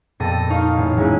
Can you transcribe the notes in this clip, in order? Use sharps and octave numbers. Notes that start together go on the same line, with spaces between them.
F2 A#2 B3 A4 A#6 D#7
D#4 D#5 F5 C#6
A1
F#3 G#3 A#3 C4 C#4 E4